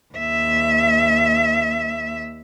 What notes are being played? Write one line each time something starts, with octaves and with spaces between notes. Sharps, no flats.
D#2 E5